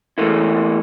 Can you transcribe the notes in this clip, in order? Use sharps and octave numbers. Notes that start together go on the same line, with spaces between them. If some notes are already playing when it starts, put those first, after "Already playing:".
E2 E3 A3 A#3 E4